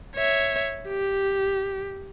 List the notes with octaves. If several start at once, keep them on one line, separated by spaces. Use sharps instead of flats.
C#5 E5
G4